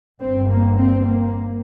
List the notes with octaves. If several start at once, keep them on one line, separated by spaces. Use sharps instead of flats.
G1 G2 C4
A#3
C4
A#3